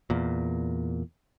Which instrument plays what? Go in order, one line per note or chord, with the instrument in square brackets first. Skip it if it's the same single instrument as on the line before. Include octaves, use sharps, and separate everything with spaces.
[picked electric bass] E2 A#2